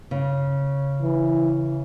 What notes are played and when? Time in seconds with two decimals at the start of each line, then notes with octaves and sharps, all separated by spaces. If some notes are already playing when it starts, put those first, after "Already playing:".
0.11 C#3
1.02 E3